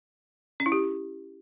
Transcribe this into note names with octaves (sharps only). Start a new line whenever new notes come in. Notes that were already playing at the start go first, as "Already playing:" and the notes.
C#4
E4
G4